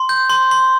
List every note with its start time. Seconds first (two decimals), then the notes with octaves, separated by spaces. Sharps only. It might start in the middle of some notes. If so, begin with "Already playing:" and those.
Already playing: C6
0.09 G6
0.30 C6
0.51 C6